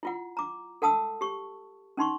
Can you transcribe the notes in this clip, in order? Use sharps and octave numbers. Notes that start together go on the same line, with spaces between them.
E4 F4 F#5
A#5 D6
A4 F#5 A5 D#6 E6
G4 C#6
C#4 D#4 C6 C#6